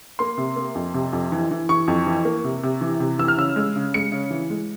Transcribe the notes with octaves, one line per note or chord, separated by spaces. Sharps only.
A#3 C6
C3
A#3
F2
C3
F2
E3
E3
E3 C#6
F2
E3
A#3
C3
C3
E3
C3
E3 E6
F6
C#3 E6
G#3
C#3
G#3 C#7
C#3
E3
G#3